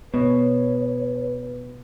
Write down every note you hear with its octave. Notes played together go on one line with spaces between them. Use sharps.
B2 B3 B4 C#5